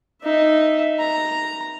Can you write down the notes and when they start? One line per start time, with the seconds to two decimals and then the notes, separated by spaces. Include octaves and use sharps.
0.22 D#4 E5
0.99 A#5